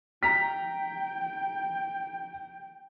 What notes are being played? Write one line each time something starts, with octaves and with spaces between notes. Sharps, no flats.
G5 A#5 B6